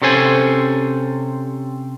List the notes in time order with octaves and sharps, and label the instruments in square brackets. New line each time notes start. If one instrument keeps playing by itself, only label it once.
[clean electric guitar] C3 C#4 A4 C5 G#5